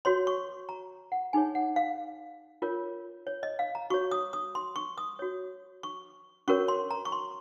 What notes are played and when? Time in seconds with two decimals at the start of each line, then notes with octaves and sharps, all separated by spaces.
0.05 F#4 C#5 C6
0.27 C#6
0.69 A#5
1.12 F#5
1.33 D#4 G#4 C#5 G#5
1.55 F#5
1.76 F5
2.62 F4 A#4 C#5
3.27 C#5
3.43 D#5
3.59 F5
3.75 A#5
3.90 F#4 C#5 C#6
4.11 D#6
4.33 D#6
4.55 C6
4.76 C#6
4.98 D#6
5.19 F#4 C#5
5.83 C#6
6.48 C#4 F#4 A#4 C#5 C#6
6.68 C6
6.91 A#5
7.05 C#6
7.12 C6